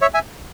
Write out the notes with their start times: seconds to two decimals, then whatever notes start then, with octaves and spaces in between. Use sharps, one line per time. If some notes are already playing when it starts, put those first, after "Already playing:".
0.02 C#5 E5
0.14 E5 G#5